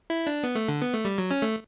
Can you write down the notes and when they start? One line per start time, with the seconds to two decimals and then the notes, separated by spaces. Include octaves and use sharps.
0.10 E4
0.27 D4
0.43 B3
0.55 A3
0.68 D3
0.81 B3
0.94 A3
1.05 G3
1.18 F#3
1.31 C#4
1.42 A3